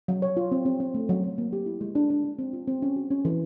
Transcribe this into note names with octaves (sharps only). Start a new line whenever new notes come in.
F#3
C#5
F4
C4
C4
C4
A3
F#3
F#3
A#3
G4
E4
G#3
D4
D4
D4
C4
F4
C4
C#4
F#4
C#4
E3